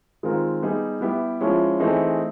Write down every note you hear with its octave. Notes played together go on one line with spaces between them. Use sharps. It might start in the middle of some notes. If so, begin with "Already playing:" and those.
D#3 G#3 C4 F4 A#4
G3 B3 D#4 G#4
G3 B3 E4 G4
F3 G#3 C#4 E4
E3 A3 C4 D#4 G#4